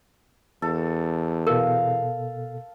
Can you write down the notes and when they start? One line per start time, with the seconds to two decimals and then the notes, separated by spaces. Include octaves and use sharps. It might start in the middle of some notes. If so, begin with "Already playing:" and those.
0.62 E2 A4
1.47 B2 A4 A#4 F5